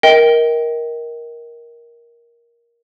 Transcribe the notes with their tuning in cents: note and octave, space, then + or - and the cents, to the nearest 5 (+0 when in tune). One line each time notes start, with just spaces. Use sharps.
A#4 +10 D#5 +35 G5 +0